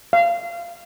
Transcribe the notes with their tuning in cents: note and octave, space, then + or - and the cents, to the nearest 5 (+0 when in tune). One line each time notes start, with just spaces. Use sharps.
F5 -25